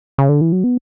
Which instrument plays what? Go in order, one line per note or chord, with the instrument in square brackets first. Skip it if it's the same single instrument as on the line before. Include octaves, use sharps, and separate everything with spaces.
[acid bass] C#3
D3
E3
F#3
B3